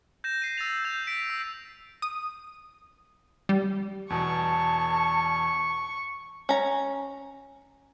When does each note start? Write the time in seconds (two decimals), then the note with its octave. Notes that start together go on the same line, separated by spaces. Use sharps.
0.24 G6 A#6 E7
0.42 C7 D#7
0.58 E6 A6 F7
0.85 G6 F7
1.07 B6 D7
1.30 E6
2.02 D#6
3.49 G3
4.10 E2 B2 A5 C#6
6.49 C#4 A#5